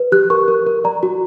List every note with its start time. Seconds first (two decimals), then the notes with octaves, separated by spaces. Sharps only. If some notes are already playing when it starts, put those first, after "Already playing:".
Already playing: B4
0.12 G4 F#6
0.30 A#4 C#6
0.48 A#4
0.67 A#4
0.84 D5 A#5
1.03 F#4